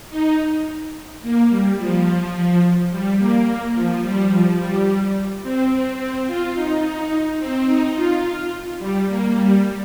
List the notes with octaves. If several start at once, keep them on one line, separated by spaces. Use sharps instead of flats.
D#4
A#3
G3
F3
G3
A#3
F3
G3
F3
G3
C4
C4
C4
F4
D#4
C4
D#4
F4
G3
A#3
G3